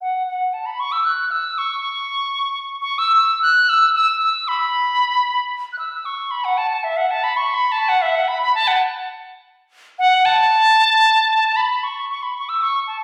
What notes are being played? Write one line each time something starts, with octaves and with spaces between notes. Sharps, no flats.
F#5
F#5
A5
B5
C#6
E6
F#6
E6
C#6
C#6
E6
E6
F#6
E6
E6
E6
B5
F#6
E6
C#6
B5
F#5
A5
A5
E5
F#5
A5
B5
C#6
B5
A5
F#5
E5
F#5
B5
B5
A5
F#5
F#5
A5
B5
C#6
C#6
B5
C#6
E6
C#6
A5